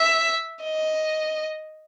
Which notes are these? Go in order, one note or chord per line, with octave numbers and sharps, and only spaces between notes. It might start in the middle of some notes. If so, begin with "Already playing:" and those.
Already playing: E5
D#5